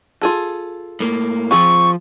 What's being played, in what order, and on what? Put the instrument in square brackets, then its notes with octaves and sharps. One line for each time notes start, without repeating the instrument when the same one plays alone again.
[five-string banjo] F4 G#4 A4
[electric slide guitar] A2 A#3
[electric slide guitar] F3 F4 [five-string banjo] C4 G#4 [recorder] C#6